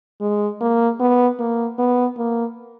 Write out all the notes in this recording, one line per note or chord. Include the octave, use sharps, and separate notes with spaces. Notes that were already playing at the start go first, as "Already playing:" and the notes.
G#3
A#3
B3
A#3
B3
A#3